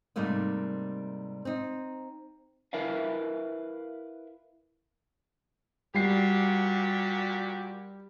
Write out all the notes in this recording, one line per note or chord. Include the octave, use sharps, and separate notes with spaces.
G#2 C3 G3 A3 A#3 D#4
C4 D#4
E4 A#4 B4 E5 F5
A#2 G3 F#4 G4 C7